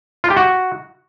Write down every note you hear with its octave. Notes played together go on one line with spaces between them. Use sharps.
F4
G4
F#4